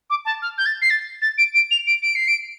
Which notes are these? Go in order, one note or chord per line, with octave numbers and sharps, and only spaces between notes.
D6
A5
F6
G6
A6
C7
A6
A6
D7
D7
F7
D7
D7
C7
D7